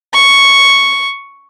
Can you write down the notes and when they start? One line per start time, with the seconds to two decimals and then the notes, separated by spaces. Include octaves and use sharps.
0.14 C#6